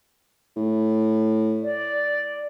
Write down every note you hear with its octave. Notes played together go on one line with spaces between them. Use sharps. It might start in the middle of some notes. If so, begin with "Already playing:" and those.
A2
D5